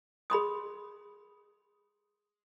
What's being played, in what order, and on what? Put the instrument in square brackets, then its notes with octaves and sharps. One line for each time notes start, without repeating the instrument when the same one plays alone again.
[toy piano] G#4 B5 C6 D#6